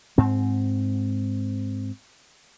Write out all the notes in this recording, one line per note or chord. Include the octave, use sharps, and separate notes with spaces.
G#2 C4